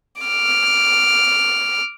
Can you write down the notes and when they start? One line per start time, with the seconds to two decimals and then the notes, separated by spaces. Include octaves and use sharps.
0.22 D6 F6